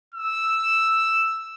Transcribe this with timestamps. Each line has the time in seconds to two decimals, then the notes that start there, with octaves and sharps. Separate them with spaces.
0.14 E6